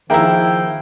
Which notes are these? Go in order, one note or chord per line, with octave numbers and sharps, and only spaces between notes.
D#3 F3 A#3 E4 G#4 E5 G5 A#5